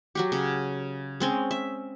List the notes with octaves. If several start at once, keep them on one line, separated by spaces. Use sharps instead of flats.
F#3 F#4 G4
C#3
G#3 C4 C#4
E5